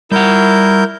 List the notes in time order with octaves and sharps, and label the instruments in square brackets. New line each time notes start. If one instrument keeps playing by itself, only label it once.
[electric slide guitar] G3 F#5 [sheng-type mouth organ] E4 A#4 G6